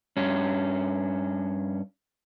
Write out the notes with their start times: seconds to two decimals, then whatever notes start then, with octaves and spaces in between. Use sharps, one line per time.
0.17 G2 C#4